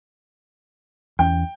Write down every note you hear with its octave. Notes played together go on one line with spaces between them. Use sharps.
E2 C#4 G5